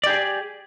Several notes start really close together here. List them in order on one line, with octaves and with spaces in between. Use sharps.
D5 G4 G#4